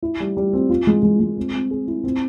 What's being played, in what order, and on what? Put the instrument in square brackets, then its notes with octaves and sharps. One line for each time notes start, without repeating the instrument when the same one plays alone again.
[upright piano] E4
G3
G3
C4
F4
G#3
G#3
G#3
C4
C4
G#4
E4
C4